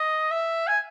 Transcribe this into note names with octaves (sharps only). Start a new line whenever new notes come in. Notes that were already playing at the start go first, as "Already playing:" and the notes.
Already playing: D#5
E5
G#5